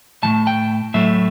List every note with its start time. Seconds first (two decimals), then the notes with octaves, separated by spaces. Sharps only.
0.23 A2 E3 A5
0.27 A3
0.47 G5
0.94 A2 F#3 A3 E5